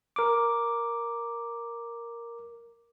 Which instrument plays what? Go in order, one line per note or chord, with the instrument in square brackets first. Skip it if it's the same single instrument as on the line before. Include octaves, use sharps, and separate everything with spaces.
[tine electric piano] A#4 D6